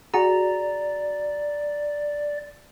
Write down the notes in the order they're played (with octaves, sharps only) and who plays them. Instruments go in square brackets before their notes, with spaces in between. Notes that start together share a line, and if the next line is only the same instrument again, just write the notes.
[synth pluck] F#4 G#4 [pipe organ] D5 [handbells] A#5